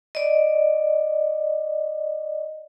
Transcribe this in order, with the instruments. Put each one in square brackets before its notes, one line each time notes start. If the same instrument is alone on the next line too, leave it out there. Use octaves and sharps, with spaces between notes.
[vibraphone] D5 D#5